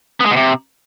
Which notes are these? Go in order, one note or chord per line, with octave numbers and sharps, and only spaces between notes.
B3
G#3
B2
C3